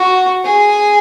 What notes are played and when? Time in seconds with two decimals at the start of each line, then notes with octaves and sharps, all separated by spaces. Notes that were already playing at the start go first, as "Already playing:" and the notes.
Already playing: F#4
0.45 G#4